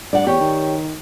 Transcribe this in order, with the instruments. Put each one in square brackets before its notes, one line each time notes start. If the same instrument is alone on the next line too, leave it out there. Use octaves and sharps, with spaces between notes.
[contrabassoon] G2 [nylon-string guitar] D5 F#5
[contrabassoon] E2 [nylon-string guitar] G4 C#5
[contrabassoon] D#3